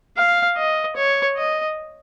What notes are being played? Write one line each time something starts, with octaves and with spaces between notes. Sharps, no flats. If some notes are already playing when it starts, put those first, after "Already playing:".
F5
D#5
C#5
D#5